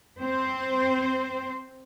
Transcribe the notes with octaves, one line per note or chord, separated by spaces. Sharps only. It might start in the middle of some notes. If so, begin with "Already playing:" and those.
C4 C5